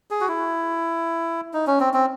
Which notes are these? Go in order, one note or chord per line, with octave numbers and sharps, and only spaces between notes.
G#4
F#4
E4
D#4
C#4
C4
C4